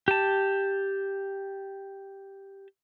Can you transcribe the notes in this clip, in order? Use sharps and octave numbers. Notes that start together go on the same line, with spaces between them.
G4 A5